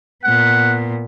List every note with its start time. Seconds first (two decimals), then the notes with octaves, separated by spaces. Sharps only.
0.24 A#2 B3 F#5